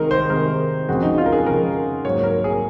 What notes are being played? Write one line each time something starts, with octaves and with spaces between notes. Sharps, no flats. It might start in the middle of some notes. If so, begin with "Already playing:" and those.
Already playing: C3 D#3 G#3 D#4 A#4
C5
C3 D#3 G#3 A#4
F2 C#3 G#3 F#4
D#4
F4
A#4
G#4
F2 C#3 G#3 A#4
G#2 F#3 A#3 C#5
A#4
G#4